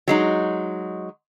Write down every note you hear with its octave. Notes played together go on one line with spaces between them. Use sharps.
F#3 G#3 D#4